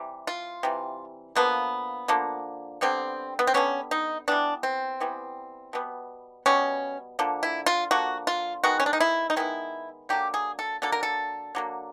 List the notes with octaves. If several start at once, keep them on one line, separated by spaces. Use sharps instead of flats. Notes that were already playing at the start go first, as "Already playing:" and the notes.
Already playing: C3 E3 G3
F4
C3 E3 G3
D3 F3 A#3 B3
D3 F3 A#3
D3 G3 B3 C4
B3
C4
D3 G3 B3 C#4
D#4
E3 G3 B3 D4
C4
E3 G3 B3
B2 G3 B3
B2 G3 B3 C#4
D3 F3 A#3
E4
F4
D3 F3 A#3 F#4
F4
D#3 G#3 B3 F#4
C#4
D4
D#4
E4
D#4
D#3 G#3 B3 E4
D3 F#3 A#3 G4
G#4
A4
D3 F#3 A#3 A4
A#4
A4
D3 F#3 A#3